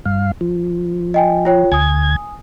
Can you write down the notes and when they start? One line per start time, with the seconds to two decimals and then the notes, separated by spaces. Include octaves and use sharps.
0.05 G2 F5
0.41 F3
1.14 D#5 G5 G#5
1.45 F4 C#5 G5
1.72 D2 G#5 D#6 G#6